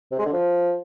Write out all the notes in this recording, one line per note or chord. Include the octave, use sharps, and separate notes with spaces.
C3
G#3
D3
F3